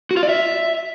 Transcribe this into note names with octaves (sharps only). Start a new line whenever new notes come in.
F#4
F4
D5
E5